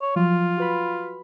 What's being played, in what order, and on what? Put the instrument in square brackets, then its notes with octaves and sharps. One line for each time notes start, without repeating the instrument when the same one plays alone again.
[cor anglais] C#5
[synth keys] F3 F#3 [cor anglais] F4
[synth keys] F#4 B4 B5